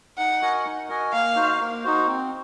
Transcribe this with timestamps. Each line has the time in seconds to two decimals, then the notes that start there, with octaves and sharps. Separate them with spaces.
0.18 D#4 F#5
0.41 F#4 A#4 D#5 G#5
0.65 D#4
0.89 F#4 A#4 D#5 G#5
1.13 A#3 F5
1.36 D#4 F#4 C5
1.60 A#3
1.84 D#4 F#4 C5
2.07 C4